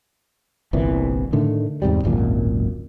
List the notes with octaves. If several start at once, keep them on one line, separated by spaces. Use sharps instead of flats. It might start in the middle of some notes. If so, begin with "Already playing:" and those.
G1 C2 A#2 E3
A2 D3 D#3 A3
E2 G#2 C3 G3
D1 G#1 F#2 A#2